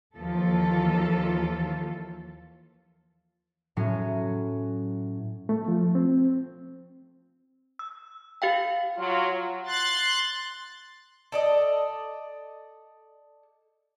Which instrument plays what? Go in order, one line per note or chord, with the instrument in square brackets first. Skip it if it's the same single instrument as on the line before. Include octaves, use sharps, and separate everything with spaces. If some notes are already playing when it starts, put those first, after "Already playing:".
[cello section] D#2 E3 F3 F4 A4
[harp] A2 F#3 C#4
[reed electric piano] A3
F3
C4
[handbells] E6
G4 F5 G5
[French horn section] F#3 [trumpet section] F4
[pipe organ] C6 F#6 A6
[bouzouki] A4 D5 D#5